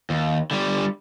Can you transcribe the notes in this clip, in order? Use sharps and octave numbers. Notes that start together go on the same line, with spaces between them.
D#2
D3 G3